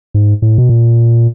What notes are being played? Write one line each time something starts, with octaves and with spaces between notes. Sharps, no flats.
G#2
A2
B2
A#2